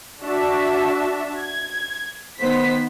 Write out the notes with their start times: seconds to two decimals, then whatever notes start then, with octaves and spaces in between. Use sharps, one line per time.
0.23 D4 F#4 E5 A5
1.38 G#6
2.41 D#3 B3 C5 B6